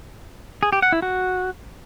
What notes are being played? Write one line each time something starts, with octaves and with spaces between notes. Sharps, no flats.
G#4
G4
F#5
E4
F#4